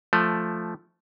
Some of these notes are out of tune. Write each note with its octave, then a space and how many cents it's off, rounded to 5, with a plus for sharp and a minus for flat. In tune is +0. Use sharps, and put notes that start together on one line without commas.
F3 +0 A3 +0